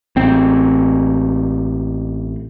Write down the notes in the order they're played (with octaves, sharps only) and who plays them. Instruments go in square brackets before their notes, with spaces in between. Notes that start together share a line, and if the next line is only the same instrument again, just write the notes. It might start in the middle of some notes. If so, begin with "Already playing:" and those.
[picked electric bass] A1 C4